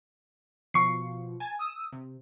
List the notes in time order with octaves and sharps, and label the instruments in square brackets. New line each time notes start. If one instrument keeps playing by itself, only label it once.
[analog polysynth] B2 F3 [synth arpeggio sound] C#6 C7
[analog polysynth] G#5 A5 G#6
D#6 E6
C3